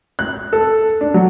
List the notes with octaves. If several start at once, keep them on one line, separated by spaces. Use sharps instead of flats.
F#6
A4
D4
F#3